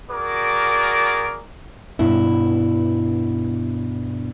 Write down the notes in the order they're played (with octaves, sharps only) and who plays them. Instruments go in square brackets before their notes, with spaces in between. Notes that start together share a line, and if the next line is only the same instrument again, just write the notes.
[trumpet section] F#4 G#4 A#4 D5 D6
[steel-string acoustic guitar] G2 B2 E4